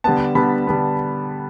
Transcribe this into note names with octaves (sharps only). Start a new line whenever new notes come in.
D3 G3 B3 A5
D3 G3 B3 B5
D3 G3 B3